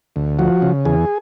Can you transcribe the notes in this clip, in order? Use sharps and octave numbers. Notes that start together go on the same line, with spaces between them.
D2
F3 F#4
C#3
E2 G#4